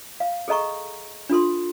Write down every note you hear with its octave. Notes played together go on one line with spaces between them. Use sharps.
F5
G#4 A4 D#5 A#5 C#6
D4 F4 A4 C6